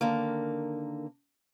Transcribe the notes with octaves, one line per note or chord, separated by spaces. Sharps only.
D3 D#3 A#3